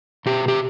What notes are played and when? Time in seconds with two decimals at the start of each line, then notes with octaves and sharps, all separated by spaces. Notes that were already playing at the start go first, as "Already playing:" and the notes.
0.26 B2 G4
0.48 G4